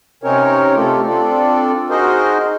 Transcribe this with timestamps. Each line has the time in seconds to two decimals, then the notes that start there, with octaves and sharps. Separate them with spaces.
0.23 C3 C4 C#4 D#4 A#4 C#5
0.76 A3 C4 F4 G4 A4
1.07 C4 D4 F4 A4 D5
1.90 D#4 F#4 G#4 A#4 C5 D#5